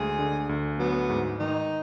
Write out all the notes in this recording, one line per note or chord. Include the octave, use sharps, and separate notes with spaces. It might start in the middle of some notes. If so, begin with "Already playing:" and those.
Already playing: D2 G#3 G#4
D3
D2
F#3 B3
G#2
D#3 D#4